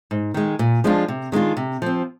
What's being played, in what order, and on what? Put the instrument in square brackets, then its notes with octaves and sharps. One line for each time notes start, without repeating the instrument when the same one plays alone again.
[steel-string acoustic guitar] G#2
D#3 G#3
A#2
F3 G#3 D4 F4
C3
D#3 G#3 D4 F4
C3
F3 C4